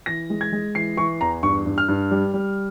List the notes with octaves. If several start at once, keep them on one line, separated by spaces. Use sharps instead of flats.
E3 A#6
G#3
G#6
G#3
E3 C7
E3 C#6
E2 A#5
G2 C#6
G2
F6
G2
G3
G3